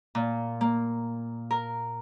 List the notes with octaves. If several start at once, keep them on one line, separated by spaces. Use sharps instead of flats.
A#2
A#3
A#4